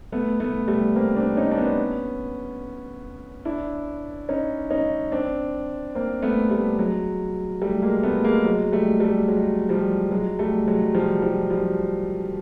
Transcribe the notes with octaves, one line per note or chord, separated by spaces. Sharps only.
A3 B3
A3 B3
G3 A3
A#3 C4
C4 D4
C#4 D#4
D4
B3 C#4
D4 E4
C#4 D#4
C#4 D#4
C4 D4
A#3 C4
A3 B3
G3 A3
F#3 G#3
G3 A3
G#3 A#3
A3 B3
G#3 A#3
F#3 G#3
G3 A3
G3 A3
F#3 G#3
F3 G3
F#3 G#3
G3 A3
F#3 G#3
F3 G3
F3 G3
F3 G3